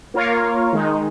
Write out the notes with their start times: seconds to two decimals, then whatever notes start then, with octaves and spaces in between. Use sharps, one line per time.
0.14 A#3 F4 A#4 C#5 F5
0.73 D#3 G#3 D#4